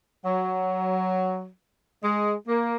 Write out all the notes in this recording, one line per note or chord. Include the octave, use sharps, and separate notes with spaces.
F#3
G#3
A#3